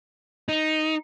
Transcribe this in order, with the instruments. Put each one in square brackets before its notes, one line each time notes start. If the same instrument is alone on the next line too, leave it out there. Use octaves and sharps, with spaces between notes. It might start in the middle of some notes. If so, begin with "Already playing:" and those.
[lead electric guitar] D#4